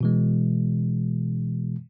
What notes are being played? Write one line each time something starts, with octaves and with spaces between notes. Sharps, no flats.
B2 E3 G#3